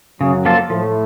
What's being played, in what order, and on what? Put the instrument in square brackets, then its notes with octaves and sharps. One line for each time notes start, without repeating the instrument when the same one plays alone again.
[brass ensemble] F#2 F#3 [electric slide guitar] C#3
[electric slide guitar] F3 A#3 F4 A4
[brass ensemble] A2 A3 [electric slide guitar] F3